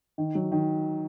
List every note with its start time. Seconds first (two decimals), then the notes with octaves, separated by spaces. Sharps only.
0.18 D#3
0.35 F#3
0.52 D#3